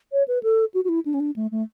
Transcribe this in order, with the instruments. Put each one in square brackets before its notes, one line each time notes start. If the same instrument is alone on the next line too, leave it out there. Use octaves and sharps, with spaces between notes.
[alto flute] C#5
B4
A4
F#4
F#4
E4
D4
C#4
D4
A3
A3